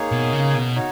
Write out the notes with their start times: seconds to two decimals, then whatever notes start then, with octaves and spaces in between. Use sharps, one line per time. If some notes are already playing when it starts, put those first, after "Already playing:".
Already playing: A#3 D#4 G#4 C#5
0.12 B2
0.33 C#3
0.54 B2
0.75 D#4 F#4 C#5